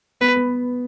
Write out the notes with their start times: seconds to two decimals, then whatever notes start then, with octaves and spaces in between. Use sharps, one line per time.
0.21 B3 B4
0.36 B3